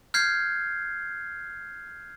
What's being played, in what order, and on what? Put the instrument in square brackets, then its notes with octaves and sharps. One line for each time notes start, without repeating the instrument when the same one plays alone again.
[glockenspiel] F6 G6 G#6 C7